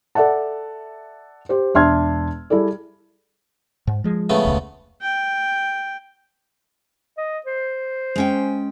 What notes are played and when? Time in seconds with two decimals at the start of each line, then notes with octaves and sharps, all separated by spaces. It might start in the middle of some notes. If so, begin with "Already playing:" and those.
0.15 A4 D5 E5 F#5 A5
1.49 G4 C5
1.74 E1 D4 E5 C6 F6 G#6
2.50 G3 E4 G#4 A4 D5
3.87 G#2
4.04 F3 G#3
4.30 C#3 A3 B3
4.45 E1 C#2
5.02 G5
7.17 D#5
7.46 C5
8.16 G#3 C#4 G5